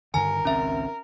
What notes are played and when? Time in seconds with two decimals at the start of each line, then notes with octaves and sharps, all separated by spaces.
0.14 G2 D3 D#3 A#4 G#5
0.45 G#1 C#2 C4 C#4 E5